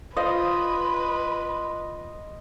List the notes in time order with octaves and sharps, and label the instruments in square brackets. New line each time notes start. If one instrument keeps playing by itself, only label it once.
[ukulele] F4 C5 F5 [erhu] B4 [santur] D#5 [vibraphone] C6